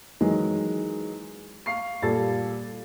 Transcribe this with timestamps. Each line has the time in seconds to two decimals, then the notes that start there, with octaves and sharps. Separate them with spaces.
0.21 D#3 E3 F#3 G#3
1.66 F5 C#6 C7
2.02 A#2 G3 A4 A6